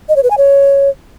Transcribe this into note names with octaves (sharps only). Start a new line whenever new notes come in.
D#5
C#5
B4
G#5
C#5